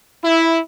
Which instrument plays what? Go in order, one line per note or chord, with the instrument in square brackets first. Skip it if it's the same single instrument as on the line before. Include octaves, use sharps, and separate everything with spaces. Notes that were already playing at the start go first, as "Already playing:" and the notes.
[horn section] E4